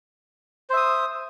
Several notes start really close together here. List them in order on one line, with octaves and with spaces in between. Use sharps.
C5 E5 D#6